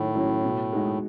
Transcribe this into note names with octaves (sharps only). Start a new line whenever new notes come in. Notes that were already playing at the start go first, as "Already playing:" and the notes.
Already playing: A2 D#3 F#3 C#4
F#3 C#4 E4
B2
G#3 D#4 F#4